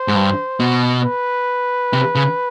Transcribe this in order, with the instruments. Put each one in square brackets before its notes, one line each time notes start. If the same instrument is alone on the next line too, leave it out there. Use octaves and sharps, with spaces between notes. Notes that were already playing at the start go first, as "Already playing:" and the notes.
Already playing: [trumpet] C5
[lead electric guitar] G#2
G2
B2
[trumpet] B4
[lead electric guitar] C3
C#3